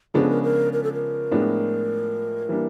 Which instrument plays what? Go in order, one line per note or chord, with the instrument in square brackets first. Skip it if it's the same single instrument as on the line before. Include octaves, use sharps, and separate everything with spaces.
[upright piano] C#3 F3 G#3 B3 D4 [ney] A#4
[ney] A4
A#4
A#4
A#4
A4
A#4
[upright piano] A2 F3 G#3 B3 D4
E3 G3 A#3 D4